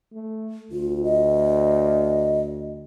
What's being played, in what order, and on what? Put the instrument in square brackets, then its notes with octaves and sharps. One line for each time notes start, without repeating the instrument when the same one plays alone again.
[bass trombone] A3
[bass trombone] D2 [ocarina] F4
[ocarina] D#5